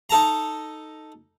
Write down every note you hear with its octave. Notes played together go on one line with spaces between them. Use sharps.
D#4 A4 A5 A#5